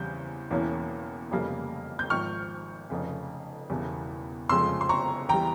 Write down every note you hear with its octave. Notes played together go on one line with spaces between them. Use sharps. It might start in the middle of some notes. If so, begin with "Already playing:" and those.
Already playing: E2 C#3 G3 C4 G6
E1 E2 E3 A#3 C#4
F1 F2 C#3 G3 A#3
G6
G#1 G#2 F3 C#6 F6
F1 F2 C#3
E1 E2 C#3 E3 G3
F1 F2 C#3 F3 G#3 C6 E6
C6
A#5 C#6
E2 E3 G3 G5 A#5